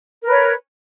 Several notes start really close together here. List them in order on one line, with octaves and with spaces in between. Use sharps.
A#4 B4 C#5